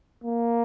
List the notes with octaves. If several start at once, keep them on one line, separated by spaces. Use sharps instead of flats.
A#3